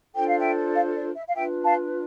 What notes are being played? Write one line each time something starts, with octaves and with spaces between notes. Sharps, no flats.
D4 F4 A4 C5 G5
F5
E5 G5
D5 F5
D5
E5
F5
D4 F4 B4 E5 G5
F5 A5